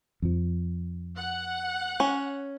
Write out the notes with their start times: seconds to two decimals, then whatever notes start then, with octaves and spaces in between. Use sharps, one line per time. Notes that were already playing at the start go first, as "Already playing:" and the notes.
0.22 F2 F3
1.15 F#5
2.00 C#4